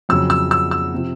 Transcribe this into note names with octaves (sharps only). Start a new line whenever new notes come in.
F2 C#3 F#3 E6
E6
E6
E6
C3 F3